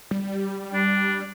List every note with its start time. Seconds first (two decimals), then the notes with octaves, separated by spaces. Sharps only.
0.11 G3
0.74 D4